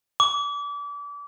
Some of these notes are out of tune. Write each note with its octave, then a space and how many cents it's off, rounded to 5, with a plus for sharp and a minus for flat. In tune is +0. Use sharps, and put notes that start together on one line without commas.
D6 -30